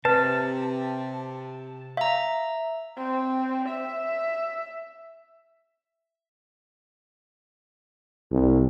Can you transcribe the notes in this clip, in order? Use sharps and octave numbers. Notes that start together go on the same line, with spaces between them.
C3 B4 A5
E5 F5 A#5
C4
E5
C2